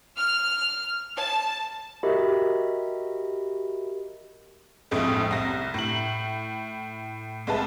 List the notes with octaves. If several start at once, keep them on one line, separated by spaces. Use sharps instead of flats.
F6
A5
F#4 G4 A#4 D#5 E5 B5
A#1 F2 A2 G#3 A3
C2 A#6
A2 F#7
C2 G#3 B4 A5